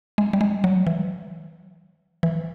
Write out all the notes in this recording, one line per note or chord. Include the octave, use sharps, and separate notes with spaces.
G#3
G3
G#3
F#3
E3
E3